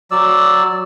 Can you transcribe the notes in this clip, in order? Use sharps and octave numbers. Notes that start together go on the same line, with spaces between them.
F#3 D5 E6